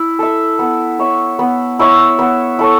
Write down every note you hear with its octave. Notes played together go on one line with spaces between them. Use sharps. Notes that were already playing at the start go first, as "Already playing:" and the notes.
Already playing: E4
A4 E5
B3
E4 C#5 E5
B3
E4 C#5 E5
B3
E4 A4 C#5